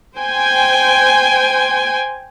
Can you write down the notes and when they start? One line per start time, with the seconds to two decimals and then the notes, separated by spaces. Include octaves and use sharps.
0.15 C5 G5 G#5